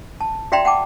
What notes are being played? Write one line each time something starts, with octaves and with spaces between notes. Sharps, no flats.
A5
F#4 D5 E5 G5 A#5 C6
F#5 G5 A5 D6